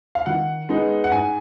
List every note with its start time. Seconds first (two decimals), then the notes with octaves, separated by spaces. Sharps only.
0.15 F5
0.26 D#3 F#5
0.69 G#3 B3 D#4
1.04 F#5
1.11 G#2 G#5